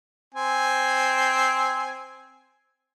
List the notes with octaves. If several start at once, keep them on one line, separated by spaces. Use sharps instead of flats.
C4 G#5